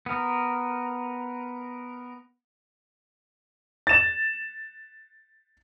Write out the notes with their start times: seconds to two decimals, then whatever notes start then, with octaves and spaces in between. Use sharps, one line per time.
0.06 B3 A#4
3.87 A6 E7